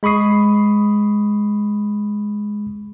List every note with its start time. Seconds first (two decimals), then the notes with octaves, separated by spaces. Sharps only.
0.03 G#3 B5 C#6 D#6 C7